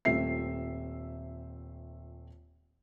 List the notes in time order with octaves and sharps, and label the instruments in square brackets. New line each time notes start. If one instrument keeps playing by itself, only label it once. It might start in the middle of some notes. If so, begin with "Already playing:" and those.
[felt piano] D#1 A3 C4 F4 E5 C7